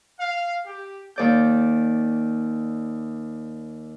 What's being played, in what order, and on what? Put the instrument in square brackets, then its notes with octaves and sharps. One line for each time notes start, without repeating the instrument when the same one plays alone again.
[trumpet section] F5
G4
[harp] D#2 D5 G6